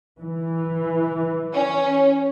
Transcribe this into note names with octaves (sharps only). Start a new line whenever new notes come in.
E3
C#4